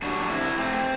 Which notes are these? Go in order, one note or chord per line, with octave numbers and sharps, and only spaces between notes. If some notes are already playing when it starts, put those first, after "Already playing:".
F#2 D3 G3 D4 F#4
C4 E4
A3 C4